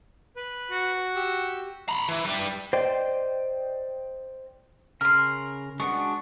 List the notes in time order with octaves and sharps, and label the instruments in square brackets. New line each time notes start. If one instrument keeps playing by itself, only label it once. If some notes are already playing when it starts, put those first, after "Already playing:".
[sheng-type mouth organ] B4
[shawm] F#4
[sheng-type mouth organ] G4 E6
[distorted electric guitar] A#5 B5
E3
G3 B4
[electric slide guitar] C5 D5 D#5 G5
[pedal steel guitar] C#3 A#4 [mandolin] B5 C6 [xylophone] F6
[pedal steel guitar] G#3 D4 F#4 [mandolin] B3 [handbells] C#6